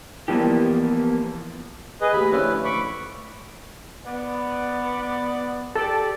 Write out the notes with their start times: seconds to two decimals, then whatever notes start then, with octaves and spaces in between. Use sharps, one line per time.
0.28 E3 F3 G3 A#3 B3 G4
2.01 G#4 B4 D#5
2.13 D#2 A2 G#4 B5
2.31 A2 D3 F3 C#4 E4 B4
2.65 B5 C#6 D6
4.05 B3 D5
5.75 G4 A4 D5